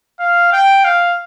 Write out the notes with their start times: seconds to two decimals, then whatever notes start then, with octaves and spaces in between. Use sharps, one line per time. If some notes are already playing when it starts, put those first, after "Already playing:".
0.20 F5
0.52 G5
0.85 F5